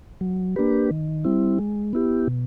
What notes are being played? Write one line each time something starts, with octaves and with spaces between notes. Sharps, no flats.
F#3
A#3 D4 G4 B4
D#3
G3 C4 E4
G#3
B3 E4 G4
B2